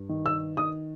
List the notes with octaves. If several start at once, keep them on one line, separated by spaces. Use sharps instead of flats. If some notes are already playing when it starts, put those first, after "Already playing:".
Already playing: G2
D#3
E6
D#3 D#6